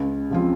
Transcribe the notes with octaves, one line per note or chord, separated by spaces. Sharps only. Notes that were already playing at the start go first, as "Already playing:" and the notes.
Already playing: C#2
C#3 F3 C4 F4